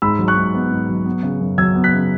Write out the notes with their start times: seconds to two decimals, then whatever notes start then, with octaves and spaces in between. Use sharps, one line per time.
0.02 G#2 B5 E6
0.19 F#3
0.28 C#6 F#6
0.37 G#2
0.55 B3
0.71 G#2
0.89 F#3
1.06 B3
1.23 C#3
1.40 F#2
1.58 F#3 E6 G#6
1.75 B3
1.84 F#6 B6
1.92 C#3